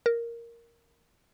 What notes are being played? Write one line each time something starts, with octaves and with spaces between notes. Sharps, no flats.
A#4